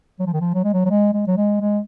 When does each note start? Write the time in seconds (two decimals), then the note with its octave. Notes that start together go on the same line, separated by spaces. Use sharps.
0.19 F#3
0.27 F3
0.33 D#3
0.41 F3
0.54 F#3
0.64 G#3
0.73 F#3
0.85 F#3
0.90 G#3
1.13 G#3
1.27 F#3
1.37 G#3
1.61 G#3